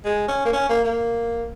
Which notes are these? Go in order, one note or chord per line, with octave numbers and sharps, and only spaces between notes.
G#3
C#4
A#3
C#4
A#3
A#3